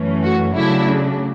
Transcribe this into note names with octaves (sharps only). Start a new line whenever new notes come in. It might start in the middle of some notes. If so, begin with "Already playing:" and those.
Already playing: F#2 E3 A3 C#4
F#4
C#3 F#3 A3 D4 E4